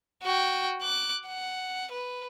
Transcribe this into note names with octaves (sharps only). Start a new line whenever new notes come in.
F#4 G5
D6 F#6
F#5
B4